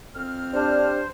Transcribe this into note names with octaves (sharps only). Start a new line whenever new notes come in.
F2 C4 F6
D4 G4 C5